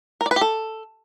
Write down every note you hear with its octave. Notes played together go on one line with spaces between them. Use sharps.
A#4
D5
B4
G4
A4